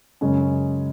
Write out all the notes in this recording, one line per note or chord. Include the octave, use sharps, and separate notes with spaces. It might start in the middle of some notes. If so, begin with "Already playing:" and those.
F#2 C#3 G#3 C#4